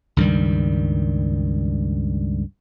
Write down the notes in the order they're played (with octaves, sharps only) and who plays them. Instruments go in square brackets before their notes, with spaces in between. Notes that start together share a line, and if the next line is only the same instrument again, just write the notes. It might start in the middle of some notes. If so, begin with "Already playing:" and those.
[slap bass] C#2 G2 D#3 G3